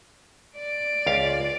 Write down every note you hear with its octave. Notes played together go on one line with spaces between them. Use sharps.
D5
C#2 F5